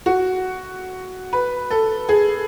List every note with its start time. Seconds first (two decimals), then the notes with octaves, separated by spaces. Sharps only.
0.06 F#4
1.33 B4
1.70 A4
2.09 G#4